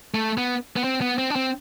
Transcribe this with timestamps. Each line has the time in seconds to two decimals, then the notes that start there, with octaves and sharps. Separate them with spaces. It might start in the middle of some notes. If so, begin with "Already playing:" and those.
0.14 A3
0.37 B3
0.76 B3
0.84 C4
1.01 B3
1.18 C4
1.30 D4
1.36 C4